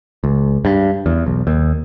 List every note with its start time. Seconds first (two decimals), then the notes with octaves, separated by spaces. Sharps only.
0.24 C#2
0.65 G2
1.06 E2
1.26 B1
1.47 D#2